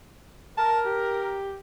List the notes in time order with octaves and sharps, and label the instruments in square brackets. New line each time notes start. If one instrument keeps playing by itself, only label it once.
[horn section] A#4 [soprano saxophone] A5
[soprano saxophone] G4